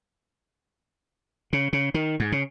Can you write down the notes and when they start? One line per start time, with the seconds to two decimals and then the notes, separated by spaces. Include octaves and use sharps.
1.53 C#3
1.73 C#3
1.94 D#3
2.20 G#2
2.32 C#3